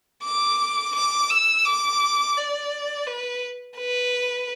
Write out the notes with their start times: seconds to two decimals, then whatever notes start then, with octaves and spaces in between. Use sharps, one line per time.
0.24 D6
0.95 D6
1.30 E6
1.65 D6
2.37 D5
3.07 B4
3.77 B4